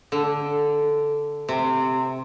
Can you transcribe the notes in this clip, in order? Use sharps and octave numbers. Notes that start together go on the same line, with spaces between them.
D3
C3